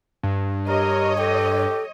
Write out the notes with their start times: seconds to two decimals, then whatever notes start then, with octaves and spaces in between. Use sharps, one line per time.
0.23 G2
0.68 G4 A#4 C#5 D#5
1.19 G4 A4